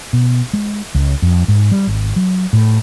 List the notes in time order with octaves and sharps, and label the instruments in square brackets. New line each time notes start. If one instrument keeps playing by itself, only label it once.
[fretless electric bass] B2
G#3
C#2
F2
G#2
G3
G#1
F#3
A2